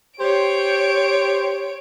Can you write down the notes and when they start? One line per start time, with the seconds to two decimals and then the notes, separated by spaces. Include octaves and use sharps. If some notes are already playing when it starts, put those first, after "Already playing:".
0.20 G4 C5 C#5 D7